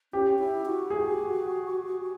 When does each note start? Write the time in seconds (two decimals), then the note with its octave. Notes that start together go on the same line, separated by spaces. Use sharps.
0.13 C#4 G4
0.38 E4
0.65 F#4
0.90 G#4